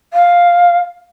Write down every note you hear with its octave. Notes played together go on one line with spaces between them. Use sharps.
F5